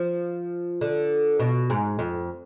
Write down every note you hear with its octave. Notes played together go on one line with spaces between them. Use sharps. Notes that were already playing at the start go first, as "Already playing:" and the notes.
Already playing: F3
D3
B2
G#2
F2